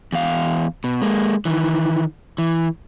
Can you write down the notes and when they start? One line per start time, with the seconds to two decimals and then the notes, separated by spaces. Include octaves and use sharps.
0.12 E2 F5
0.84 B2
1.02 G#3 A#3
1.45 D#3 E3
2.38 E3